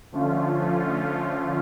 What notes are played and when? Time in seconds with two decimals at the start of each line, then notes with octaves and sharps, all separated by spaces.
0.12 D3 F3 A3 C#4 F4